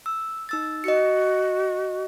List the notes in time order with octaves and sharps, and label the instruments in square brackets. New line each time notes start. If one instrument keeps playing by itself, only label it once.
[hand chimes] E6
D#4 E6 A6
[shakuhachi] F#4 [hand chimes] D#5 C#7